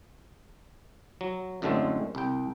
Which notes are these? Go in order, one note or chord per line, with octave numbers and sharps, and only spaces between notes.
F#3
F#2 A2 D3 G#3 A3 C4
C2 G5